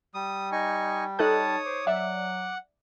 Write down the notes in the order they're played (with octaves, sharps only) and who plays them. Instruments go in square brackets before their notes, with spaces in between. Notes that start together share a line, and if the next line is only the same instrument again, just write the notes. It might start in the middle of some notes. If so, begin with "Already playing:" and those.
[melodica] G3 [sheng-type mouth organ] D#6
[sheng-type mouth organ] D#4 G#5 C#6 [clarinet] D#5
[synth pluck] D#4 A4 F#6 [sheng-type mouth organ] C#5 D#6 [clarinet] A5
[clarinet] C5 [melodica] D6
[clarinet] F#3 [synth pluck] D5 E5 [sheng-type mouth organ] F#5